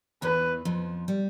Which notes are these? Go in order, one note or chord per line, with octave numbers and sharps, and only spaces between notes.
E2 E3 B4
F2 F3
G3